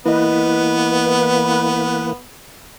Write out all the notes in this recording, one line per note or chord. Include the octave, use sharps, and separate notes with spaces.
E3 A#3 B3 E4 B4 D#5